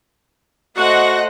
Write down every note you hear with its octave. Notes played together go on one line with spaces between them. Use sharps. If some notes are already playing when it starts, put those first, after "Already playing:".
A3 F#4 C5 D#5 F#5 A#6